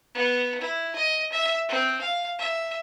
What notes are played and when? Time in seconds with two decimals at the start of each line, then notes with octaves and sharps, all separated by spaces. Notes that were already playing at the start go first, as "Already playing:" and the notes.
0.14 B3
0.61 E4
0.95 D#5
1.32 E5
1.69 C4
2.01 F5
2.39 E5